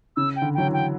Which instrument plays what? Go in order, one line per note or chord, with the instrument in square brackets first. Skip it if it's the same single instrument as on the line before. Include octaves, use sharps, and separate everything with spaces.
[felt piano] C#3 [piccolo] E6
[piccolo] G5
[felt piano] D3
[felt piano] F#3 [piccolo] G5
[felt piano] E3
[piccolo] G5